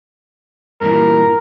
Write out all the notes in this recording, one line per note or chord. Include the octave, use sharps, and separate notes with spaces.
G2 A#2 E3 A#4